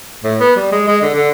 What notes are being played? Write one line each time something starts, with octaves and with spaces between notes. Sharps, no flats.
A2
B3
G3
G#3
G#3
D3
D3